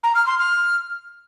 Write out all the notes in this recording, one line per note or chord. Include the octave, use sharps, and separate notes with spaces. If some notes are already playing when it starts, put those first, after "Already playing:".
A#5
F6
C6
F6